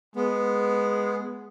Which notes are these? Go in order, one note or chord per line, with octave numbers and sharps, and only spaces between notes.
G#3 B3